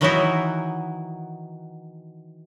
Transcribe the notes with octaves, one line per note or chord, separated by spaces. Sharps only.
D#3 E3 F#3 B3 D#4 E4